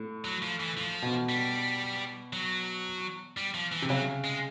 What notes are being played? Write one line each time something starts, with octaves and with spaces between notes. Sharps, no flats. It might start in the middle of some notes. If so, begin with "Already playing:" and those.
Already playing: A2
F#3
F3
E3
F3
B2
G3
F#3
G3
F3
E3
C3
C#3 F#3
G#3